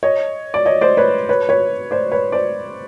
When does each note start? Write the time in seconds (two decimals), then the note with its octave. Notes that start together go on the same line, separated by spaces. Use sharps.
0.03 C#5 D#5
0.54 D5
0.65 C#5 D#5
0.81 C5 D5
0.97 B4 C#5
1.29 B4 C#5
1.49 B4 C#5
1.91 C5 D5
2.12 B4 C#5
2.32 C5 D5